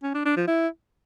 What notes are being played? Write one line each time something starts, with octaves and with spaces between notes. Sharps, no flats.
C#4
D4
D4
F3
E4